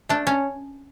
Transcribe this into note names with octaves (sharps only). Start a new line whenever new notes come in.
A3 D4
C#4